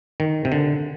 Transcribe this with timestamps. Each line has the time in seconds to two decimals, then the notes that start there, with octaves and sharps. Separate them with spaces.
0.20 D#3
0.45 C3
0.52 D3